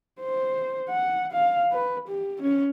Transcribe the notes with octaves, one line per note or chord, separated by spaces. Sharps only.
C5
F#5
F5
B4
G4
C#4